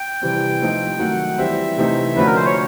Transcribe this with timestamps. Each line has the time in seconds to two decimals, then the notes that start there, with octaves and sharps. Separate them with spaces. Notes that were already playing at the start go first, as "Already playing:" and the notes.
Already playing: G5
0.22 C3 E3 G3 C4
0.61 F3 A3 C4 D#4
0.99 D#3 F#3 A3 F#5
1.38 E3 G3 C4 E5
1.77 C3 E3 A3 C4 D#4
2.16 D3 F3 A3 C#4 F#4 B4
2.26 A#4
2.36 C5
2.45 C#5